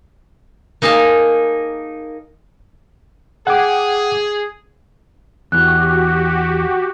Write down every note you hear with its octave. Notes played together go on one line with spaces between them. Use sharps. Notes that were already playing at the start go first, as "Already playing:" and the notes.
A#3 D#4 G#4 F5 A5
G#4 F#5 G5 D6
E2 E3 F#4 G4 F#6